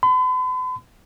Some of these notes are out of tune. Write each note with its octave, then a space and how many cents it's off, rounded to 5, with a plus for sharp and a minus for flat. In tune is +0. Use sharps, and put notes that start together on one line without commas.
B5 +45